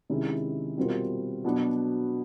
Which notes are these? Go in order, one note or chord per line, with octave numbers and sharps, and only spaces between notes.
C3 D#3 G#3 C#4 E4
B2 G3 C4 F4 A#4
B2 F#3 B3 D4 F#4